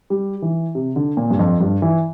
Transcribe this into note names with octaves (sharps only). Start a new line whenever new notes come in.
G3
E3
C3
D3
A#2
G2
F2
G2
E3